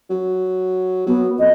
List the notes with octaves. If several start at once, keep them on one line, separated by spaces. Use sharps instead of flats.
F#3
F#3 B3
F2 D#5